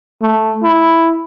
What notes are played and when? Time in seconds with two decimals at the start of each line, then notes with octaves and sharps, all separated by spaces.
0.22 A3
0.63 E4